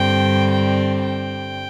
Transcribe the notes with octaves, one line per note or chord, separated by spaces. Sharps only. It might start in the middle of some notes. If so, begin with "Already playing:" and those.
Already playing: G2 D3 G3 C4 G5
G5
G5